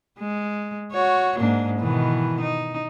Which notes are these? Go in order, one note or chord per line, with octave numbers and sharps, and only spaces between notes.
G#3
F#4 C#5
G#2 A#3 D4
B2 D#3 E3
D#4